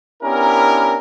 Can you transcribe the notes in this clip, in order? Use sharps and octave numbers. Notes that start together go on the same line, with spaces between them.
B3 C#4 D4 E4 G4 A#4